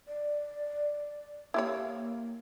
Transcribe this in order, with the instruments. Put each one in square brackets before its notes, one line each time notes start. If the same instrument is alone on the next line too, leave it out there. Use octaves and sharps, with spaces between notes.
[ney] D5
[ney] A#3 [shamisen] E4 G4 C#5